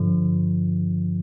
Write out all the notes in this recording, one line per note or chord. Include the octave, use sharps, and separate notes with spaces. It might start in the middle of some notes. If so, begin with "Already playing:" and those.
Already playing: G2 D3 F3